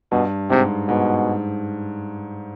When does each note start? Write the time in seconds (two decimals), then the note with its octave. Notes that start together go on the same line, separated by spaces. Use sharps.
0.11 G2 B2
0.50 G#2 C3
0.88 G#2 B2